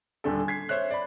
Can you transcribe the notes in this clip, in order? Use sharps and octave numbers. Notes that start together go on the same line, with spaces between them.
D#1 D3 A4
G#6 B6 C7
C5 C#5 E5 F#6
D5 B5